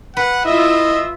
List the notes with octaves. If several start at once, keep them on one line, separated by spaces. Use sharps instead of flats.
B4 F#5
E4 F4 D#5 E5